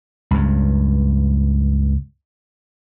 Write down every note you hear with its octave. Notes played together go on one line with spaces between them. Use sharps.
C#2 G2